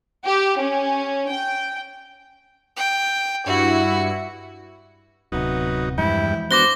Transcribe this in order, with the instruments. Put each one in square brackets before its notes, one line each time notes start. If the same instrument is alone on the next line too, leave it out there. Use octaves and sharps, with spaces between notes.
[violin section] G4
C#4
G5
[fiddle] G5
[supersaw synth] G2 E4 C#7 [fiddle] F#4
[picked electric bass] D1 C3 [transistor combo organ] F#3 D#4 [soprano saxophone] B3
[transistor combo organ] E2 G2 G5 [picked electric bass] E3 F3 G#3 [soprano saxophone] E4
[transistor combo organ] B3 D4 F#4 [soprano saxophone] C5 [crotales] D6 A#6 G7